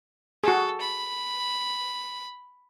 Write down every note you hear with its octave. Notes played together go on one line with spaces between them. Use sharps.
F#4 G#4 A4
B5